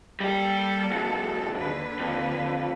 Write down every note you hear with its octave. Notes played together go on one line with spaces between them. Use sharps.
G3 A#3 G4 A4
B1 E2
D#2 D3 B4
F2